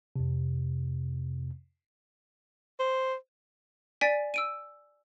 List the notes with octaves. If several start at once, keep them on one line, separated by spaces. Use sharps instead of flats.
F2 C3
C5
D5 G#5 A6 B6 D7
E6 D7 D#7